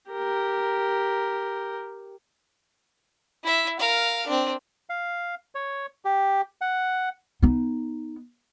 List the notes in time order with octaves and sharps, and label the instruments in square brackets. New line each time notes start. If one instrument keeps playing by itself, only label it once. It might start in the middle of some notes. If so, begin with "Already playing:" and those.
[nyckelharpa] G4 A#4
[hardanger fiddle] E4 E5
A#4 F5
C4 D4
[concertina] F5
C#5
G4
F#5
[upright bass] B3 D#4